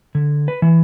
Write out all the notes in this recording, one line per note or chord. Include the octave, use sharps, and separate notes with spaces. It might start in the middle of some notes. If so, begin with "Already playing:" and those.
D3
B4
E3